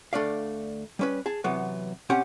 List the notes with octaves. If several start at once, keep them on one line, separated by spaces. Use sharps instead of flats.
D2 A3 D4 D5 F5
G3 C#4 B4
G#4 A5
C3 E3 F#3 B3
B2 C4 C#4 G4 F#5 G#5